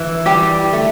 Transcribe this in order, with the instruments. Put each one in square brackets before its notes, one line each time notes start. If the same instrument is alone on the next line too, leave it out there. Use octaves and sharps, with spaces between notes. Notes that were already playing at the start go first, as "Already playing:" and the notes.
Already playing: [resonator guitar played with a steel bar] E3
[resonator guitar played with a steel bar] G3 [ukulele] G4 G5
[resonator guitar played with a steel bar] A3